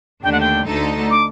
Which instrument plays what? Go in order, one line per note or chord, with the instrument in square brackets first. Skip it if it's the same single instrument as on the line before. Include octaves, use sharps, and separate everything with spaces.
[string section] D#2 D3 A3 D4 [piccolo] G5
[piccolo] F#5
G5
[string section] D2 D3 A3 D#4 A4
[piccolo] D6